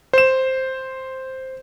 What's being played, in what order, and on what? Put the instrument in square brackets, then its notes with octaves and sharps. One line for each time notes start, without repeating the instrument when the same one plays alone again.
[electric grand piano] C5 E7